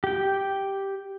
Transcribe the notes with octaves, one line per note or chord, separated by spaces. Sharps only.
G4 G5